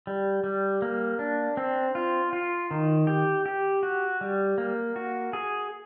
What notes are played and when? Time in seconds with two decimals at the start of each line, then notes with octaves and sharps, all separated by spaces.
0.07 G3
0.44 G3
0.82 A#3
1.19 D4
1.57 C4
1.95 F4
2.33 F4
2.71 D#3
3.07 G4
3.46 G4
3.83 F#4
4.21 G3
4.58 A#3
4.96 F#4
5.33 G#4